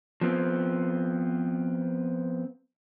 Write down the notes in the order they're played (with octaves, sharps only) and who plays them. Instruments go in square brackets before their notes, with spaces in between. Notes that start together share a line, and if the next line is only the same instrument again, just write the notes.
[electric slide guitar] F3 B3 C4